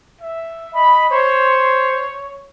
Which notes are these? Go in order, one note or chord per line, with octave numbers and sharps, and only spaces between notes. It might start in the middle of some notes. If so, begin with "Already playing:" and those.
E5
D#5 B5
C5 C#5